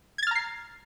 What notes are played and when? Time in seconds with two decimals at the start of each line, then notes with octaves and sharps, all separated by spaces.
0.18 G#6
0.23 A6
0.27 F6
0.31 A#5
0.35 C7